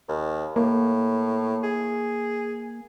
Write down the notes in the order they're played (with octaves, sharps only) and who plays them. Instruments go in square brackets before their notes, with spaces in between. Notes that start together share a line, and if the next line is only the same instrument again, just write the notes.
[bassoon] D#2
[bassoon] A2 [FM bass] A#3
[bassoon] G#4